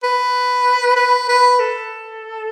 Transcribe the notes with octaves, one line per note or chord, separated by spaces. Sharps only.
B4
B4
B4
A4